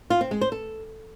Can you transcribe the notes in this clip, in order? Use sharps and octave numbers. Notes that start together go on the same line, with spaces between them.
F4
C4
G#3
C5
A4